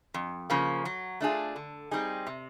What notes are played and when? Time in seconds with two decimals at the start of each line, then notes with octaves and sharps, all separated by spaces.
0.14 F2
0.50 C#3 F3 A#3
0.85 F#3
1.21 A3 D4 F4 G#4
1.56 D3
1.91 G3 C4 D#4 G#4
2.27 C3